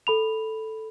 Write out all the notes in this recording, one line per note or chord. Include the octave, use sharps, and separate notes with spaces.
A4 B5 F7